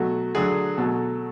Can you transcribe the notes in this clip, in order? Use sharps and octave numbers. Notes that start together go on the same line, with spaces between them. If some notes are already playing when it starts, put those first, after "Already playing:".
Already playing: B2 F#3 A3 F#4
D3 F#3 A3 G#4
B2 F#3 A3 A4